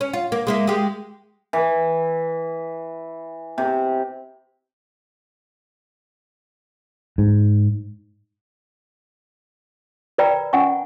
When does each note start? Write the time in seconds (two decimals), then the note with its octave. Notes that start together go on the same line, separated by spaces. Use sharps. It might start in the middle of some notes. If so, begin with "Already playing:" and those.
0.01 C#4
0.13 F4
0.32 A#3
0.47 G#3 A#3 E4
0.67 G#3 G4
1.53 E3
3.58 C3
7.18 G#2
10.18 A#4 B4 D5 G5 A#5 B5
10.53 C#4 F#5 G#5 C#6